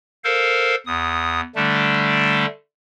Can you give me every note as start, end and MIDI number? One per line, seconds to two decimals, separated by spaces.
0.24 0.76 69
0.24 0.76 70
0.24 0.76 72
0.24 0.76 77
0.86 1.41 40
0.86 1.41 87
1.56 2.46 50
1.56 2.46 55
1.56 2.46 57
1.56 2.46 62